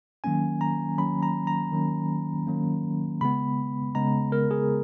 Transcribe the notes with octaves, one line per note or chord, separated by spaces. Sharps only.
D#3 F#3 A#3 C#4 G#5
A#5
D#3 F#3 A#3 C#4 B5
A#5
A#5
D#3 F#3 A#3 C#4
D#3 F#3 A#3 C#4
C#3 G#3 B3 B5
C#3 G#3 B3 A#5
A#4
G#4